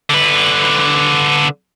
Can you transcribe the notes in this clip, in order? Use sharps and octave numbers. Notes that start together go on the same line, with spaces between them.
D3 B4